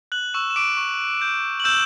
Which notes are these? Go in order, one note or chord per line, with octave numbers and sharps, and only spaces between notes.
F#6 F#7
C#6 E6 E7
E7
D6 D7
C#6
G6
F#7
E6 G6 E7